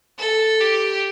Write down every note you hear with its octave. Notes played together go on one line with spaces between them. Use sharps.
A4
G4